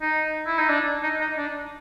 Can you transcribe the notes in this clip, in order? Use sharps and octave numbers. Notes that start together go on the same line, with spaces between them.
D#4
E4
D#4
D4
D#4
D#4
D4